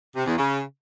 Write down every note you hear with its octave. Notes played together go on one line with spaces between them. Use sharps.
C3
E2
C#3